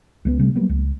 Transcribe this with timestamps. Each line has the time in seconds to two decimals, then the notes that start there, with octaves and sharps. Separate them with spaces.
0.25 C#2 G#3 B3
0.39 C3 G3 A3
0.55 F#3 G3 A#3 B3
0.69 C#2